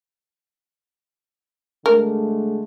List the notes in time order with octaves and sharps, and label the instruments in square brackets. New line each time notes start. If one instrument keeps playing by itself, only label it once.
[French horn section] D3 G#3 A3 [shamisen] A#4